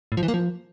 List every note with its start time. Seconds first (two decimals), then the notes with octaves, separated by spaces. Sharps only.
0.12 A2
0.17 F3
0.23 E3
0.28 A#3
0.34 F3